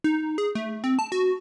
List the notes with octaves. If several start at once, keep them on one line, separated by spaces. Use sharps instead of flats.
D#4
G#4
A3
C4
A5
F#4